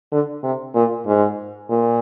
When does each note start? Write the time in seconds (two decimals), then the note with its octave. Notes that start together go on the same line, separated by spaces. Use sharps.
0.12 D3
0.43 C3
0.75 A#2
1.06 G#2
1.70 A#2